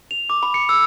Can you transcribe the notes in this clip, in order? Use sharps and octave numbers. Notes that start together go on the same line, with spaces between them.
F7
D6
B5
C#7
E6